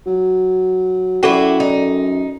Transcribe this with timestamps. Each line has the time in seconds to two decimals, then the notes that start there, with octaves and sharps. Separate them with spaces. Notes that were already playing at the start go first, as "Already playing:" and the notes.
0.07 F#3
1.23 F#2 E4 F#4 A4 G5
1.60 D#4